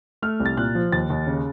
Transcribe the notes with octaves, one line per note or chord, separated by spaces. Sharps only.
A3 F6
C2
A6
A#2 F#6
F3
D#2 A6
D#2
C#3